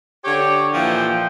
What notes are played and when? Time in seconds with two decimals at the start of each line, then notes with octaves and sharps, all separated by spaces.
0.24 D3 G4 C#5
0.74 A#2 E3 F3 G5